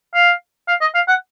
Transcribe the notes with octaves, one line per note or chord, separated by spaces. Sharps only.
F5
F5
D#5
F5
F#5